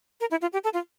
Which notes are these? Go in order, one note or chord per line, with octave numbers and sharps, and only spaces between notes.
A#4
E4
F4
G4
A4
F4